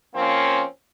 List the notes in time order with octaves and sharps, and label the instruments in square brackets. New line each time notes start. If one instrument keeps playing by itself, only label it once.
[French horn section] F3 A#3 C4 C#4